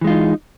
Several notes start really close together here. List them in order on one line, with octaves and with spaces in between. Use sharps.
E3 G#3 F4 D#4